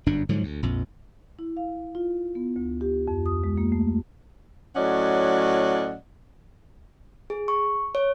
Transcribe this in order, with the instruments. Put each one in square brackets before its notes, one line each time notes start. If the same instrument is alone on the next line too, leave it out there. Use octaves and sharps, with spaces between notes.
[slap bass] G1 F#2 D4
G#2 D3 F3 F#3
D2
A#1 F2
[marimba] E4
F5
F4
B3
D2
G4
F2
D#6
G#3
A#3
A3
[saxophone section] A2 F#3 C#4 D5 D#5 F#5
[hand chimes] G#4
C#6
C#5